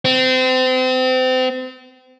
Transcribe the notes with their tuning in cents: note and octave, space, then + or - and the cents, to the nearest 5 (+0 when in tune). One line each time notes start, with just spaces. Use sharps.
C4 -30